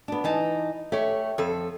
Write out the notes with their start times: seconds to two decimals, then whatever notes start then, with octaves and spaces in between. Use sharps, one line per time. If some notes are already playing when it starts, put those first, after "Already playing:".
0.08 B3 D4
0.24 E3 D#4 A5
0.92 A3 G4 C#5
1.38 F2 A4